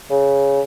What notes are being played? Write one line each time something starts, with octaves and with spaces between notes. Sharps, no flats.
C#3